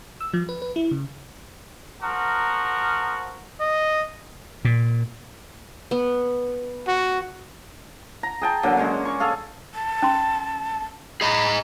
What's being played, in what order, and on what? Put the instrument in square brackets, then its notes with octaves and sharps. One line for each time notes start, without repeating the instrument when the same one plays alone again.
[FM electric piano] E6
F3
B4
B4
E4
C#3
[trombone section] F3 F#4 A#4
[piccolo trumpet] D#5
[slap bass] A#2
[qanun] B3
[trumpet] F#4
[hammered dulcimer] A#5
G#4 G5 A5
D3 F#3 A#3
G#3 C#4
C#6
G#4 A4 F5
[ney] A5
[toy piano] C#4 C6
[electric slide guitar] G#4 D#5 A#5 [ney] B5